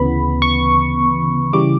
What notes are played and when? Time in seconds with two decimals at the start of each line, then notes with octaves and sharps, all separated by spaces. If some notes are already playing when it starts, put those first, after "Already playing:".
Already playing: D2 C#3 E3 B3 B5
0.42 C#6
1.53 C#3 E3 G3 D6